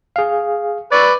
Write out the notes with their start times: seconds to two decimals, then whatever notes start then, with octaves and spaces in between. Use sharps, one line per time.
0.16 G#4 F5
0.92 B4 D5 C#6 E6 A6